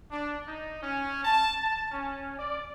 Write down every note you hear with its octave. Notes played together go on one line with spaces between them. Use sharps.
D4
D#4
C#4
A5
A5
C#4
D5